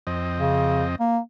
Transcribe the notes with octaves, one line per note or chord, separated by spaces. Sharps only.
F2 C4 D#5
C#3
A#3